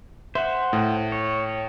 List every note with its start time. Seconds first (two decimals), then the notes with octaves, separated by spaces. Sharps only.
0.35 C5 E5 F#5
0.73 A2
1.12 C#5